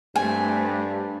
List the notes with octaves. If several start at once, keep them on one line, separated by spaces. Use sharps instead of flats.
G2 A3 C4 G#5